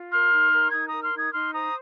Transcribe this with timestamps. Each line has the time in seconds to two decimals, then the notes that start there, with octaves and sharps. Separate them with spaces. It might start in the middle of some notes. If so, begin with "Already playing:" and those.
Already playing: F4
0.11 A#4 C6 F6
0.32 D#4
0.52 A#4
0.72 D#4 D#6 G#6
0.88 A#4 A#5 D#6
1.03 C6 F6
1.13 D#4 D#6 G#6
1.33 D#4 C6 F6
1.53 C5 A#5 D#6